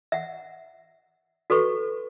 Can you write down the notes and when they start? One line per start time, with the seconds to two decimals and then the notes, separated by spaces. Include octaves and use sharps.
0.12 E5 F#5
1.50 F#4 A4 B4 C#6